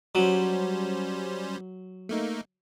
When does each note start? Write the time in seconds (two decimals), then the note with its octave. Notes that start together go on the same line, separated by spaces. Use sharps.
0.15 F#3 G3 C#4 C5
2.09 A3 A#3 D#4